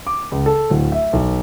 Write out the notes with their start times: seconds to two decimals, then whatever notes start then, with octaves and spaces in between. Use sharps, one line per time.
0.07 D6
0.32 C#2
0.46 A4
0.70 D1
0.92 E5
1.13 B1